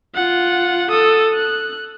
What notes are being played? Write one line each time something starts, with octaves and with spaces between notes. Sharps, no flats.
F4 F#5
A4 D#6
F#6